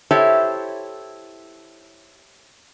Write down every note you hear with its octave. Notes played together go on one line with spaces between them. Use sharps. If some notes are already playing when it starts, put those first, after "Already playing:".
E4 G4 A4 C5 C#5 E5